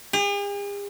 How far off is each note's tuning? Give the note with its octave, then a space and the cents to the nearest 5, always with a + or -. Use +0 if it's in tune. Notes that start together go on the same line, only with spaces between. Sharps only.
G#4 -45